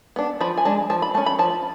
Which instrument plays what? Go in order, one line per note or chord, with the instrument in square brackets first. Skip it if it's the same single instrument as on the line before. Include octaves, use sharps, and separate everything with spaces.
[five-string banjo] B3 D4
F3 B5
G#5
G#3 D4 A5
F3 A5
B5
A3 C#4 A5
B5
F3 A5